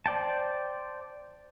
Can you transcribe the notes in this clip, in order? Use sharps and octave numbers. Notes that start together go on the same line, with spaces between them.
C5 D5 G5 A5